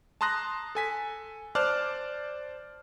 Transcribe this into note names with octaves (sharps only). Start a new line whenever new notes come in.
A5 A#5 C6 D#6 F#6 A#6
A4 G#5 B6
C5 D5 A5 D6 F6 F#6